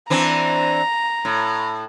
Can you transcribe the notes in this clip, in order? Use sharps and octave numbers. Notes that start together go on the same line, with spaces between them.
E3 C4 D4 A#5
A2